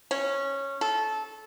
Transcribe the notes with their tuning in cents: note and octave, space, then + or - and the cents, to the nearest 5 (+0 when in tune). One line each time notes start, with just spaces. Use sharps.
C#4 -10
A4 -20